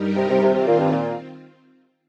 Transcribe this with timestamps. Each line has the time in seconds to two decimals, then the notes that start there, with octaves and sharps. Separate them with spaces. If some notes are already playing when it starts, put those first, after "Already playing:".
Already playing: G2 G3 D#4 G4 A#4
0.16 C3
0.29 C3
0.41 C3 D#3 C4 F4
0.54 C3
0.67 A#2
0.79 G2
0.92 A#2